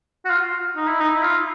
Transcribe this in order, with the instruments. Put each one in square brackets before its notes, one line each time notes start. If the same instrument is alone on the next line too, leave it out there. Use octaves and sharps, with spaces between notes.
[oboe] F#4
F4
D#4
E4
D#4
E4
F4